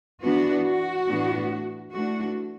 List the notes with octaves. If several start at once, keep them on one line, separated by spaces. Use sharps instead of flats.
E3 B3 D4 F#4
F#4
A2 E3 B3 D4
E3 A3 D4 F#4